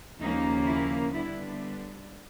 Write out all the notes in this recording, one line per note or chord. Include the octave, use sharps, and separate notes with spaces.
D#2 C#3 F3 A#3 C#4 D#4
E4
D3 G3 B3 D4 E4